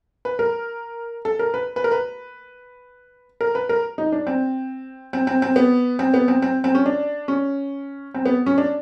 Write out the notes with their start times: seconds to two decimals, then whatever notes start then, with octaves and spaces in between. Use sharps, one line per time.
0.25 B4
0.39 A#4
1.25 A4
1.39 A#4
1.54 B4
1.76 B4
1.84 A#4
1.92 B4
3.41 A#4
3.55 B4
3.69 A#4
3.98 D#4
4.12 D4
4.27 C4
5.13 C4
5.27 C4
5.42 C4
5.56 B3
5.99 C4
6.14 B3
6.28 C4
6.42 C4
6.64 C4
6.75 C#4
6.86 D4
7.28 C#4
8.14 C4
8.26 B3
8.46 C#4
8.58 D4